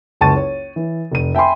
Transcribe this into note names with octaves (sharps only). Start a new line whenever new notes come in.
F#1 C#2 A5 C#6 A6 D#7
C#5
E3
F1 D#7
E5 G5 G#5 B5 C6